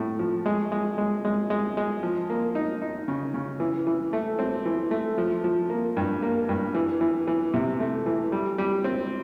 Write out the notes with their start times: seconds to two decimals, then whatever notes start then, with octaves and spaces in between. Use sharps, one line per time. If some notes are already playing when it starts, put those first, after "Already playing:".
Already playing: A2
0.19 F3
0.46 G#3
0.72 G#3
0.98 G#3
1.25 G#3
1.50 G#3
1.77 G#3
2.03 F3
2.30 A#3
2.55 D#4
2.82 D#4
3.08 C#3
3.34 C#3
3.60 E3
3.87 E3
4.13 A3
4.39 C4
4.65 E3
4.91 A3
5.18 F3
5.44 F3
5.70 A#3
5.97 G2
6.22 A#3
6.49 G2
6.74 E3
7.01 E3
7.27 E3
7.54 C3
7.80 A3
8.06 E3
8.32 G3
8.58 G3
8.84 C4